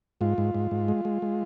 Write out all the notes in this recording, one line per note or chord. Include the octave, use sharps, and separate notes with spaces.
G#2 F4
G#2
G#2
G#2
G#3
G#3
G#3